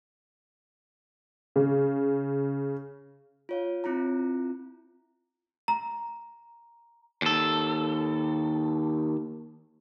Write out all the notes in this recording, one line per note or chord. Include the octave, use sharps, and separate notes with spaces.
C#3
F4 C#5 F5
C4 E4 F4 A#5
A#5
D#2 A4